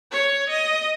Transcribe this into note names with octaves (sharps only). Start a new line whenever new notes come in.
C#5
D#5